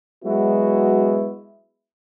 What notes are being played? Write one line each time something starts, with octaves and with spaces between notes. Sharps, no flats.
F#3 G#3 B3 E4 F#4